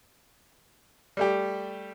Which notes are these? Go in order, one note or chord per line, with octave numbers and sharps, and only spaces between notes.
G3 A3 G4